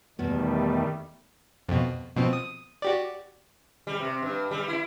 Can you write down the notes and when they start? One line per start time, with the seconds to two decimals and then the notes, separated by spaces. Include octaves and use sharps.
0.19 E2 B2 D#3 G3 A3 B3
1.69 F2 B2
2.16 B2 F3 C4
2.33 D#6
2.82 F#4 G4 D5
3.87 G3
4.00 C3
4.22 G2
4.51 G3
4.68 E4